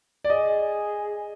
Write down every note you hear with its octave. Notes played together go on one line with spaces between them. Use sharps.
D5
G#4 D#5